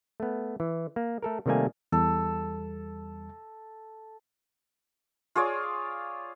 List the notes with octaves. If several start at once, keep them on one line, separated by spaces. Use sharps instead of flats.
A3 B3
E3
A#3
A3 A4 A#4
C3 D#3 G3 A3 A#3 G#5
E2 G3 A4
F4 G#4 C#5 D5